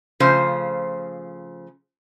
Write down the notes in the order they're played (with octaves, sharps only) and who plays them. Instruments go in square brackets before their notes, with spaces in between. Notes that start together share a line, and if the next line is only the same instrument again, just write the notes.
[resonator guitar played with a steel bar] C#3 F3 A3 F4 C5